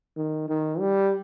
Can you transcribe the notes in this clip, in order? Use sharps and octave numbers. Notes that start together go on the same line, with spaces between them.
D#3
D#3
G3